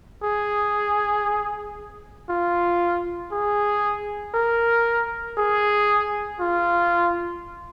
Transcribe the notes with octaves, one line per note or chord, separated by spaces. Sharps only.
G#4
F4
G#4
A#4
G#4
F4